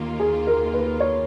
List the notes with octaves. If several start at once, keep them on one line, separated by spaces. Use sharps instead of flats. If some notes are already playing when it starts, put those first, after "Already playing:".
Already playing: D#2 D#3 A#3 F4
G#4
A#4
B4
C#5